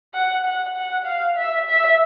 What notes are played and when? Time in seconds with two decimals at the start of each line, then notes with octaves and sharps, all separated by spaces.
0.14 F#5
0.46 F#5
0.76 F#5
1.05 F5
1.37 E5
1.67 E5